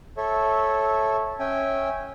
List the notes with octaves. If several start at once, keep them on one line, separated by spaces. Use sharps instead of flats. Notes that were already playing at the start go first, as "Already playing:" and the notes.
A4 C#5 E5
C#4 E5 G5 G#5